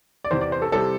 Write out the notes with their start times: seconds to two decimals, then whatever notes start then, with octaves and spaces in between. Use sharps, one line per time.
0.24 D5
0.31 E2 C3 E3 C5
0.41 D5
0.52 C5
0.62 A4
0.72 C3 G3 C4 E4 A4